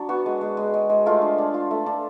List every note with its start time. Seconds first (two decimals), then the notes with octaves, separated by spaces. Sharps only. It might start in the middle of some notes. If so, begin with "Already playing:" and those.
Already playing: F#3 D4
0.09 B3 F#4
0.26 G#3
0.41 G#3
0.57 G#3
0.74 G#3
0.90 G#3
1.06 A3 F4
1.22 D4
1.38 D4
1.54 F4
1.71 A3
1.86 D4